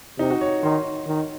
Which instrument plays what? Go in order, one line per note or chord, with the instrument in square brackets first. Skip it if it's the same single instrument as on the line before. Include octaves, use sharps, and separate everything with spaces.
[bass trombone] C3 [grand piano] D#4
[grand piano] F#4
C#5
[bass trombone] D#3 [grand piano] C6
[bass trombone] D#3